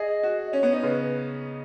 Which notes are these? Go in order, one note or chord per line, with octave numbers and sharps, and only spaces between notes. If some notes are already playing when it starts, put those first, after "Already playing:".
Already playing: G#4 D#5
F#4
D#5
C#4 C#5
B3
D#4
C#3 B4
B4